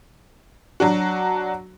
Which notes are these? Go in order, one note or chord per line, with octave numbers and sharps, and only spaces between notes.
F#3 D4 F#4